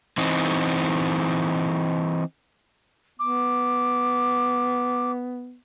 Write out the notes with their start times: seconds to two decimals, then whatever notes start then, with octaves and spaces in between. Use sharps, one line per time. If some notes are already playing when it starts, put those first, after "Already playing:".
0.18 E3 C4 D#4
3.19 B3 D6